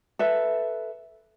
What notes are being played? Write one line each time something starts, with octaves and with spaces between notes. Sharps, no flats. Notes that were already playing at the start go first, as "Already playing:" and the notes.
A4 B4 E5